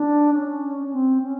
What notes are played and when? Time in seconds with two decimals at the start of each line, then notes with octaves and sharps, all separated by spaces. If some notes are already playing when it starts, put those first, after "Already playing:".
Already playing: D4
0.34 C#4
0.83 C#4
0.93 C4
1.22 C#4